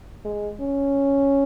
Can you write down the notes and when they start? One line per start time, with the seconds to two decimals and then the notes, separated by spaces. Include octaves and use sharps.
0.25 G#3
0.60 C#4